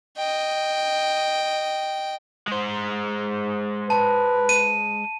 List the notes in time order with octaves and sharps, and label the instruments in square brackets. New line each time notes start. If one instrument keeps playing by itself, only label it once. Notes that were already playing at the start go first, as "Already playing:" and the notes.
[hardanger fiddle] D#5 G5
[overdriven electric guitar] G#3 C5
[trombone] B4 [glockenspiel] A5
[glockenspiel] D#7